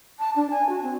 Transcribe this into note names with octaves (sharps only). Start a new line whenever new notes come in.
A5
D4
G#5
F#4
C4